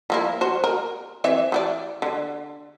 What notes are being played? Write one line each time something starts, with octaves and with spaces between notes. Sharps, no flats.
F3 A#3 E4
F#4 C5
A#4
E3 C4 E5
E3 F#4 D5
D3